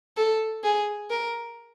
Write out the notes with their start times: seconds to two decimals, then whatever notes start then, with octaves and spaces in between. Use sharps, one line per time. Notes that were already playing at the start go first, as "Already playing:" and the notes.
0.17 A4
0.64 G#4
1.10 A#4